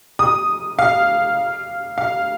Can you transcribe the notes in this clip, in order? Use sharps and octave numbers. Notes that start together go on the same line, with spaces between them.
D#6
F5
F5